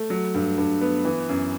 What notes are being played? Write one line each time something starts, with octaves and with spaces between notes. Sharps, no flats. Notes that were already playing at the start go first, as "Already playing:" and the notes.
Already playing: A3
F#3
G2
G2
B3
E3
F#2